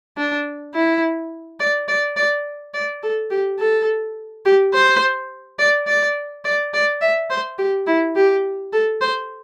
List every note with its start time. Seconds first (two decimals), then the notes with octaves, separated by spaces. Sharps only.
0.17 D4
0.75 E4
1.60 D5
1.88 D5
2.17 D5
2.74 D5
3.03 A4
3.31 G4
3.59 A4
4.46 G4
4.74 C5
5.59 D5
5.87 D5
6.45 D5
6.74 D5
7.01 E5
7.30 C5
7.58 G4
7.87 E4
8.16 G4
8.73 A4
9.01 C5